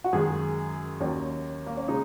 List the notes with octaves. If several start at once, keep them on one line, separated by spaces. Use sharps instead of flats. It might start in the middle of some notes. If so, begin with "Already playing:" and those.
F#4
F#2 D#3 G#3 G#4
D#2 D#3 F#3 C#4
A#3
C#4
C#3 G#3 D#4